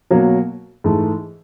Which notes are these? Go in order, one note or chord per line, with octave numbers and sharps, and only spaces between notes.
B2 F#3 A#3
G#2 E3 A3